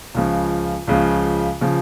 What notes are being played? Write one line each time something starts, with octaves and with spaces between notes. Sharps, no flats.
C#2 C#3 F3
C#2 C#3 F3
C#3 F3